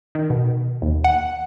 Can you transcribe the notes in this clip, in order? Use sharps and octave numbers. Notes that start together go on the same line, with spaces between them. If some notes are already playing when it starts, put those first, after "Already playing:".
D#3
B2
D#2
F#5